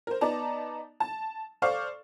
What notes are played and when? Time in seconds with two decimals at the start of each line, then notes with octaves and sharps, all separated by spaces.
0.07 A#4 C5
0.21 B3 D#4 D5 A5 A#5
1.00 A5
1.62 A4 C5 D5 F5 C#6